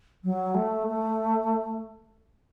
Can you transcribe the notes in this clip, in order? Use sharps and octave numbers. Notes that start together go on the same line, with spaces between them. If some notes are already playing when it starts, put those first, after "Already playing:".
F#3
A3
A3